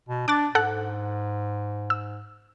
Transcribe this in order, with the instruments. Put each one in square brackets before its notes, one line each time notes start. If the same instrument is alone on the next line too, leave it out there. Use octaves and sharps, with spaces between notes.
[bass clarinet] B2
[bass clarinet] D4 [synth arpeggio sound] D6 F#6 A6
[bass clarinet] G#2 [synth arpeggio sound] A4 F#5 F#6
[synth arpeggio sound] E6